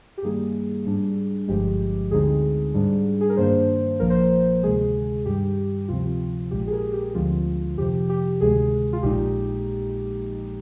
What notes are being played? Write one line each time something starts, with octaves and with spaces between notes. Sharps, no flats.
G4
G2 D#3 G3 A#3 D#4 G#4
G#2 G3 D4
G1 G2 F3 G#3 G4
D2 D3 G#3 C4 D#4 G#4
G#2 G3 D4
G#4
A#4
G2 D#3 A#3 D4 C5
A#1 A#2 F3 A#3 A#4
C5
A#4
D2 C3 D#3 G#3 G#4
G2 D#3 G3 G4
D2 C3 F3 C4 F4
A#1 A#2 G#3 G4
G#4
A#4
G4
D2 D3 F3 G#3 C4 F4
F2 C3 F3 G4
G4
D2 C3 D#3 G#3 G#4
F4
A#1 A#2 G#3 D#4 G4